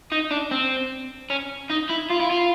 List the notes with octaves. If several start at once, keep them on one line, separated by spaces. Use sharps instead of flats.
D#4
D4
C4
C#4
D#4
E4
F4
E4
F4